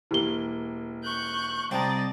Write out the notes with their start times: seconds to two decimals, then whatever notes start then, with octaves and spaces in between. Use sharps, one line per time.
0.11 E1 A#3 E4 G4 G7
1.04 C#6 F#6 G6
1.71 C2 C4 D5 D#5 G5 A5 A#5